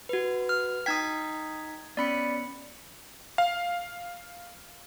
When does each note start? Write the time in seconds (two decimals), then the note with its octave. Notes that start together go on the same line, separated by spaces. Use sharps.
0.09 F#4 B4
0.49 F6
0.86 D#4 G5 D#6 G#6 B6
1.97 B3 C#4 D5 B5 C#7
3.38 F5